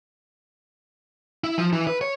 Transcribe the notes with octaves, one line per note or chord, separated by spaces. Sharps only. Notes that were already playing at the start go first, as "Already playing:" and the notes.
E4
F3
E3
B4
C#5